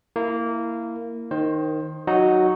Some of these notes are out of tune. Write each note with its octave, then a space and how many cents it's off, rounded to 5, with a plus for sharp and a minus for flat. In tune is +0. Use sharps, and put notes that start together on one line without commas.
A#3 -15 E4 +0
D#3 +0 C5 +20
F#3 +0 D#4 +0 F#4 +0